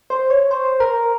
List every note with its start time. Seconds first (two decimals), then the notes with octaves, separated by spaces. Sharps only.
0.10 C5
0.30 C#5
0.51 C5
0.80 A#4